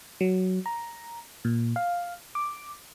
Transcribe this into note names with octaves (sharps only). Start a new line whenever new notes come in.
F#3
A#5
A#2
F5
D6